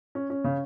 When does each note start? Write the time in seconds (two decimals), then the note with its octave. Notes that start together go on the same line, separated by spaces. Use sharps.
0.15 C#4
0.30 C#4
0.44 C#3